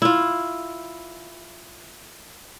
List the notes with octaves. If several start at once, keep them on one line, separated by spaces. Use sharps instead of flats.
E4 F4